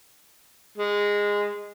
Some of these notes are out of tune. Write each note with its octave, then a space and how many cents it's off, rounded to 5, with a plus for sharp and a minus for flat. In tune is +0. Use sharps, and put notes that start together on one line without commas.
G#3 -15